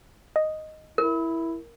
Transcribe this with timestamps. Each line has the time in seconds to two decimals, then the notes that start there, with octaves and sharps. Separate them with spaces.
0.36 D#5
0.98 E4 A#4